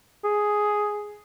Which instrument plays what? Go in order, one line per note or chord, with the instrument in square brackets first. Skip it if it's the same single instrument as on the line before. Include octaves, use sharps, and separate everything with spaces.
[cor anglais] G#4